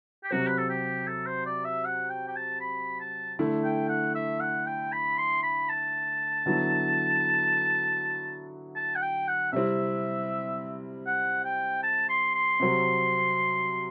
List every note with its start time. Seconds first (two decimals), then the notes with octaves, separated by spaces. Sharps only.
0.24 G4
0.31 C3 F#3 C4 F#4
0.47 B4
0.58 A4
0.70 G4
1.07 A4
1.26 C5
1.46 D5
1.65 E5
1.85 F#5
2.10 G5
2.28 G5
2.36 A5
2.61 B5
3.00 A5
3.39 D3 A3 E4
3.64 G5
3.90 F#5
4.15 E5
4.40 F#5
4.66 G5
4.93 B5
5.18 C6
5.43 B5
5.69 A5
6.46 D3 F#3 B3 E4
8.76 A5
8.95 F#5
9.02 G5
9.28 F#5
9.53 C3 G3 C4 E4 E5
11.07 F#5
11.45 G5
11.83 A5
12.09 C6
12.35 C6
12.60 C3 F#3 C4